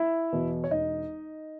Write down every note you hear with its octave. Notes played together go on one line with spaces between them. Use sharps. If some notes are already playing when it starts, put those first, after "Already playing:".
Already playing: E4 E5
E2 B2
C#5
E1 D#4 D#5